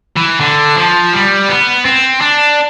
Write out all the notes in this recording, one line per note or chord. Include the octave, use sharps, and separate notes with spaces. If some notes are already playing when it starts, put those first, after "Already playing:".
E3
D3
F3
G3
B3
C4
D4